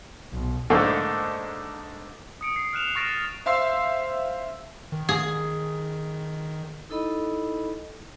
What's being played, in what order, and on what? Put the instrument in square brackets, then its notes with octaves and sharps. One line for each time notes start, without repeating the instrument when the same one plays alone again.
[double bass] B1
[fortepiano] G#2 D3 A3 A#3
[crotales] D#6 C#7 D7
C7
F6 F#6 E7 F7
C#6 F6 A6 A#6 D7 E7
[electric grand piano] C5 E5 F5 C6 E6 C7
[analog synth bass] D#3
[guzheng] G#4
[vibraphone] D#4 E4 A4 D#5 B5